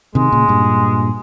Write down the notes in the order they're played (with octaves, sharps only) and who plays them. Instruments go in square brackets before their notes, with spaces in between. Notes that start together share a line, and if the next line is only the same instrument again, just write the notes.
[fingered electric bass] C3 D#3 [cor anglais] G#3
[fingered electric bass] A#2 C#3
G2 A#2